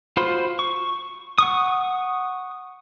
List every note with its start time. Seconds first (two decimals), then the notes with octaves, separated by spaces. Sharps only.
0.17 F4 F#4 C5 B5 C6
0.59 C#6
1.38 F#5 C#6 D#6